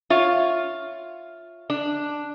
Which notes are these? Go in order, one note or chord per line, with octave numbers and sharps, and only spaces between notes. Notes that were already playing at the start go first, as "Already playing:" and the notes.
F4 C#5 E5
D4